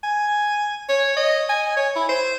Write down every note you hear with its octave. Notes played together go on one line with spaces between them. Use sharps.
G#5
C#5
D#5
G#5
C#5
E4
C5